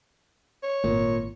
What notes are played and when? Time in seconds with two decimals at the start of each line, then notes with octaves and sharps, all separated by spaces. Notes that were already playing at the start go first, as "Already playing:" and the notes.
0.63 C#5
0.84 G#1 A#2